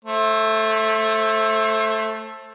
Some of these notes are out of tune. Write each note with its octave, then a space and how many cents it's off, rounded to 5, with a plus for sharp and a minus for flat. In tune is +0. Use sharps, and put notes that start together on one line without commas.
A3 +0 C5 +35